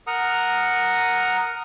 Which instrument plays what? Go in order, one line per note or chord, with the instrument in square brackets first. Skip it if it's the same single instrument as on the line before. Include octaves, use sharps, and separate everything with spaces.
[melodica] A#4 F#5 A#5 D#6